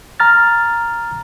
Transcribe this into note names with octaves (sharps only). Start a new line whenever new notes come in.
A#5 F6 A6